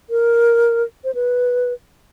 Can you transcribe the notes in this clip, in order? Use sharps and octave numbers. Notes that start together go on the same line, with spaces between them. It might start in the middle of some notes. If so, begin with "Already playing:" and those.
A#4
C5
B4